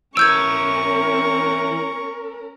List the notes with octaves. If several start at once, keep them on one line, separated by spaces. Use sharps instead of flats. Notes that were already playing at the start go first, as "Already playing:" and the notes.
E3 C#4 A#4 C#5 C#6 E6 G6 G#6